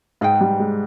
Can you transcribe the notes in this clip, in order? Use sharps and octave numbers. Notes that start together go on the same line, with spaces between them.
G#2 G#4 B4 G5
G3
G#3